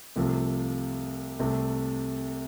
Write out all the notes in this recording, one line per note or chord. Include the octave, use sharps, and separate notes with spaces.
C2 C3 F3 A3
C2 C3 A3